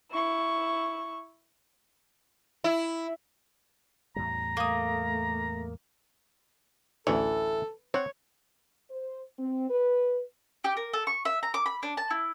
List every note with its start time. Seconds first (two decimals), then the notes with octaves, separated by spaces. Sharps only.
0.11 E4 C#6
2.64 E4
4.16 E2 A2 G3 A#5
4.57 A3 A#3 D#6
7.07 A1 D2 E3 A4 C#5
7.94 C4 C#5 F#5
8.91 C5
9.39 C4
9.70 B4
10.64 G4
10.77 A#4
10.93 A4
11.07 C#6
11.25 E5
11.43 A#5
11.54 D6
11.66 B5
11.83 D4
11.97 A5
12.10 E4